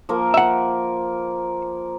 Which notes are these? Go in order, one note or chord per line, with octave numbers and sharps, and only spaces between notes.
F3 A#3 A#4
E5 F#5